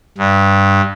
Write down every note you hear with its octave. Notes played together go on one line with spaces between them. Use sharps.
G2